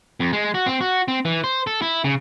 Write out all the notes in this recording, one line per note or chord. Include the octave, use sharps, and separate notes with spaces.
F2
G#3
F#4
C4
F#4
C4
E3
C5
A4
E4
C#3